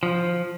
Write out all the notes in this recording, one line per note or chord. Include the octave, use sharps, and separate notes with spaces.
F3